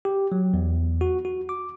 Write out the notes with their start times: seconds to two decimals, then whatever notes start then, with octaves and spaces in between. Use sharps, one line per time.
0.05 G4
0.32 F#3
0.54 E2
1.01 F#4
1.25 F#4
1.49 D6